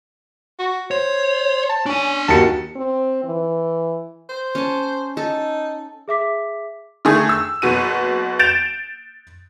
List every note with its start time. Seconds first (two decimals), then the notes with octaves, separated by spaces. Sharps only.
0.59 F#4
0.91 C5 C#5
1.69 A5
1.86 C#4 D4 G#5
2.28 D#2 F#4 A5 C#7
2.76 C4
3.24 E3
4.29 C5
4.55 C#4 A5
5.17 D#4 A4
6.08 G#4 E5 D6 B6
7.05 D3 D#3 A3 G#4
7.29 E6
7.62 F#1 B2 F#4 D#7
8.39 G6 A6 D7 E7 F7